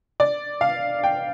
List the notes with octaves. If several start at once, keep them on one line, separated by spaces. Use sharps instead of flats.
D5
F5
G5